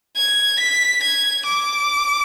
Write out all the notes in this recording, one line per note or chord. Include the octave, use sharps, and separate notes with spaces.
G#6
B6
G#6
D6